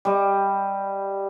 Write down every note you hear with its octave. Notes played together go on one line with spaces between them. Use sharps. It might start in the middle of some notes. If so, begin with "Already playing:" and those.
G3 D#5